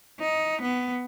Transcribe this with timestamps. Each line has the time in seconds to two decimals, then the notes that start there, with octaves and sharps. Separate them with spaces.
0.20 D#4
0.62 B3